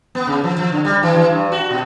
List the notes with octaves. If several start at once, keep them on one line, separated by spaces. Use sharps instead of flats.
B3
C#3
F3
F3
D3
G3
E3
E3
G2
F#4
B2